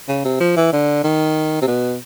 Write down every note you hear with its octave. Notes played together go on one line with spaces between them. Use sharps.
C#3
C3
F3
E3
D3
D#3
C3
B2